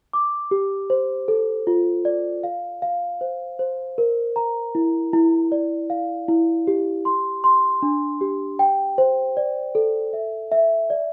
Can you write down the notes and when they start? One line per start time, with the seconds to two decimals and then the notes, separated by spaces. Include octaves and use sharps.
0.13 D6
0.51 G4
0.90 C5
1.28 A4
1.67 F4
2.05 D5
2.44 F5
2.82 F5
3.21 C5
3.59 C5
3.98 A#4
4.36 A#5
4.75 E4
5.13 E4
5.52 D5
5.90 F5
6.29 E4
6.67 G4
7.05 C6
7.44 C6
7.82 D4
8.21 G4
8.59 G5
8.98 C5
9.37 D5
9.75 A4
10.13 E5
10.52 E5
10.90 D5